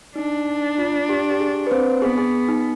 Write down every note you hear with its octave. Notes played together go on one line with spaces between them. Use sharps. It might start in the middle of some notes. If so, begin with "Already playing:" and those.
D4 D#4
F4
G4
G4
G#4
B4
C4 C5
B3 G#4
G#4
D#4